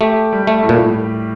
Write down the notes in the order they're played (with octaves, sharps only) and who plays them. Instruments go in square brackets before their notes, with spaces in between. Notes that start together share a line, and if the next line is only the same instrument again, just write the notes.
[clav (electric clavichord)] A3 [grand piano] G4
[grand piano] G3
[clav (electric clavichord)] A3
[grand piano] A2
[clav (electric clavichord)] A#2